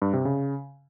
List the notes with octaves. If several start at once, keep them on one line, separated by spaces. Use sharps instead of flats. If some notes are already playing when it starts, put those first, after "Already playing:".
G2
C3
C#3